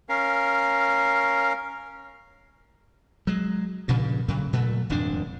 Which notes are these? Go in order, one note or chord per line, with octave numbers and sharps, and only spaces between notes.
C#4 A#4 F5
F#3 G#3
G2 A#2 C#3 F3
A2 C#3 F#3
A#2 F#3 A3
D#1 F2 G#2 D4